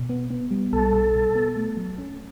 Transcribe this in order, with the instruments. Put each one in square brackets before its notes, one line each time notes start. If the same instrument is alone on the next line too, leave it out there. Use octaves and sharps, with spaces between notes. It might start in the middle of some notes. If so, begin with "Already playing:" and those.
Already playing: [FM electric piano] B2
B3
B3
G3
[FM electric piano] B1 [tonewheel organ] A4
[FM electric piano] B2
B2
B3
A3
F#3
C#4